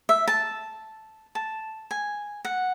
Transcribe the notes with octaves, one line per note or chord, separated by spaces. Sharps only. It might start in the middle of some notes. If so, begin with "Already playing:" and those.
E5
A5
A5
G#5
F#5